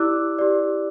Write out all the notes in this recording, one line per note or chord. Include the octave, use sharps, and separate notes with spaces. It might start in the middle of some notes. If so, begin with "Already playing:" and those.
Already playing: E4 G4 D5 D6 E6 F#6
G4 D5